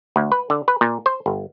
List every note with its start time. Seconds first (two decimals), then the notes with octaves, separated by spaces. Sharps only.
0.16 D2
0.32 B4
0.50 D3
0.68 B4
0.81 A#2
1.06 C5
1.26 G1